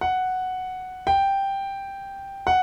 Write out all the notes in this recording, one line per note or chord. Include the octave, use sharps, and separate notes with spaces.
F#5
G5
F#5